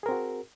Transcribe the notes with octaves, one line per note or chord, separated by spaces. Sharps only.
C4 F#4 G#4 A#4